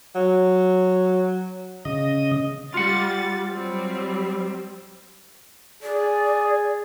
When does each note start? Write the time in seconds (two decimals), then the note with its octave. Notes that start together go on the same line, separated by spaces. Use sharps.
0.15 F#3
1.85 C#3 D#5
2.74 G3 F4 F#5 A6
3.52 F#3 G3 C4
5.83 G#4 D5